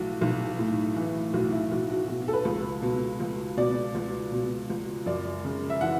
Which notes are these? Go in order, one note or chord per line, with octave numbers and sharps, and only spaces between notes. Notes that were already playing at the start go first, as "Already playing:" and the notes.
Already playing: B1 A2 E3 F#4
B1
A2
E3
B1 F#4
E4
B1 F#4
F#4
B2 F#4
A4
B4
C#2
B2
C#2
B2 D5
C#2
B2
C#2
F#2 D5
C#3
E5
E3 F#5